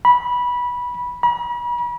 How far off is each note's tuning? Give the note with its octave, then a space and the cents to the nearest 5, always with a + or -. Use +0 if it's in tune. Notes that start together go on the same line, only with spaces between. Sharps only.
B5 -15
B5 -40